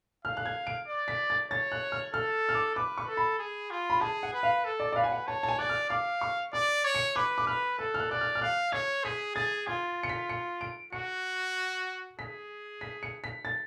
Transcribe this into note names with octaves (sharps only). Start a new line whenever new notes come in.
F5 F6
F#6
G#6
D7
D5
B6
A6
C#5 A6
F#6
F6
A4 F6
F6
D6
B4 D6
C#6
A4
B5
G#4
F4
B5
G#4 A5
F#5
B4
F5
A4
D5
D5
B4 F5
G#5
F#5
C#5 A5
A5
G#5
D5 F#6
F6
F5 D6
C#6
D5 D6
C#5
C#7
B4 D6
D6
B4 F6
A4 F#6
F6
F#6
D5 F#6
F6
F6
F5 F#6
C#5 G#6
G#4 B6
G#4 A6
F4 G#6
C#7
B6
C#7
D7
F#4 C#7
G#4 B6
B6
C#7
B6
A6